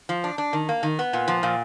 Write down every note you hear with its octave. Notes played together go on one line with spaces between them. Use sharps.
F3
D4
D4
D#3
A#3
D#3
B3
A#2
F3
A#2